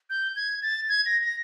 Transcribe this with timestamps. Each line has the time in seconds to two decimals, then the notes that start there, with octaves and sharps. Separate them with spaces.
0.10 G6
0.36 G#6
0.62 A6
0.89 G#6
1.06 A#6
1.23 A#6